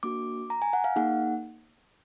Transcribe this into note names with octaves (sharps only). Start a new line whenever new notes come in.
A#3 D4 F#4 D6
A#5
G#5
F#5
F5
A#3 D#4 G#4 F#5